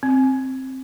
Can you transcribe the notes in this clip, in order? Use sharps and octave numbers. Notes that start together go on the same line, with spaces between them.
C4